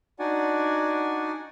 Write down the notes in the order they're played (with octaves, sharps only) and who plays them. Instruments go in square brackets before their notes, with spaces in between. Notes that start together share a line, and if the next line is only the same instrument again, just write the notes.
[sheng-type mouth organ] D4 D#4 F#4 D5 F#5 G#5